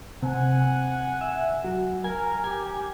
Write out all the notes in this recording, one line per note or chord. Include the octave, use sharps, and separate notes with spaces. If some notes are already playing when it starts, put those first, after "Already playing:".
C3 F#5 G#5
E5
F#3
A#4 G#5
G4 G#5